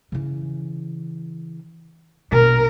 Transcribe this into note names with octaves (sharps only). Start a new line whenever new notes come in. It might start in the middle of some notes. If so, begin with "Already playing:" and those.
C#3 E3
A#1 B2 A#4